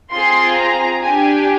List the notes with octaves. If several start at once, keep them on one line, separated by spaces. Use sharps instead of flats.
C4 F4 G#4 C6
A#5
D4 G4 G#5